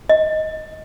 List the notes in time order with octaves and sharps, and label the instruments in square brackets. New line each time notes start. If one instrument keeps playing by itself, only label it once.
[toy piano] D#5